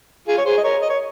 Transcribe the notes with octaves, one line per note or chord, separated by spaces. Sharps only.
F4 G#4
C#5
G#4 C5
D#5
A#4 C#5
D#5
C#5